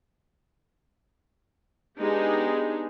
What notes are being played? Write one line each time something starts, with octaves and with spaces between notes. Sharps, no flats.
G#3 B3 D4 D#4 G4 G#4